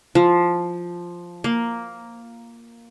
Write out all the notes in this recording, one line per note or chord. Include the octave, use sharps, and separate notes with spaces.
F3
A#3